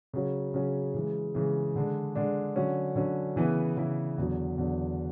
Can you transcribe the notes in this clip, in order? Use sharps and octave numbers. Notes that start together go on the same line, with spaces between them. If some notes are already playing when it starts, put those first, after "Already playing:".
C#3 F#3 C#4
C#3 F#3 C#4
C#3 E3 G#3
C#3 E3 G#3
D3 G#3 D4
D3 G#3 D4
D3 F#3 C#4
D3 F#3 C#4
C#3 E3 B3 E4
C#3 E3 B3 E4
E2 D3 F#3
E2 D3 F#3